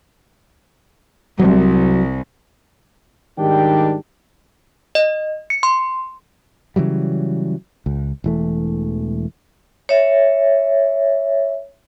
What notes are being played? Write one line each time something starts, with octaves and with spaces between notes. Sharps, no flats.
C2 F#3
G#2 D#3 G3 D4 G4 G5
D#5
C#7
C6
C#3 E3 F#3 G3
C#2
E1 E3 A3
C#5 E5